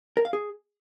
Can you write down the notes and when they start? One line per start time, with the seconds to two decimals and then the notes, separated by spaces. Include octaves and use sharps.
0.17 A#4
0.25 F5
0.33 G#4